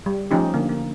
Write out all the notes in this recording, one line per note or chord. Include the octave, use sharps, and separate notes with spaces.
G3
F3 A3 C#4 D#4 G4
D3 A#3
A#3